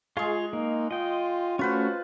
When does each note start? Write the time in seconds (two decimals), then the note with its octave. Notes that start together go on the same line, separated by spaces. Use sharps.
0.17 G#3 F4 G#4 F5 C#6
0.53 A#3 D#4
0.91 F4 D#5 G5
1.59 A3 C#4 F4 F#4 B4 C5